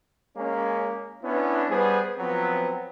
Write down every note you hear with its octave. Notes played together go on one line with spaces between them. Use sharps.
G#3 A#3 C#4
B3 C#4 D4 E4
G3 B3 G#4 B4 C5
F3 F#3 B3 C4